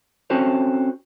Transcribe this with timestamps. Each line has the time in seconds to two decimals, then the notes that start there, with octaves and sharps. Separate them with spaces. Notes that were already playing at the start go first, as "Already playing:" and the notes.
0.30 C4 C#4 F#4 A4 C5 C#5